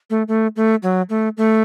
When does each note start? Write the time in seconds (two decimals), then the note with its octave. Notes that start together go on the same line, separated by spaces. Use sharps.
0.10 A3
0.28 A3
0.56 A3
0.83 F#3
1.10 A3
1.37 A3